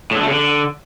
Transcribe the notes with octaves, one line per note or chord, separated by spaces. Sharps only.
A2
D3
A3
C#3
D3